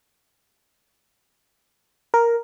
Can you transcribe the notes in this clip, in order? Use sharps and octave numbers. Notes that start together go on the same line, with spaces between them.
A#4